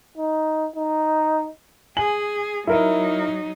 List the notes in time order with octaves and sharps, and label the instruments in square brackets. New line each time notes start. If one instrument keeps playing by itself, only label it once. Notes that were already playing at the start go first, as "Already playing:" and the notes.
[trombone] D#4
D#4
[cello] G#4 [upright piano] G#5 F#7
[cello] F#3 D#4 [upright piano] E4 A#4 E5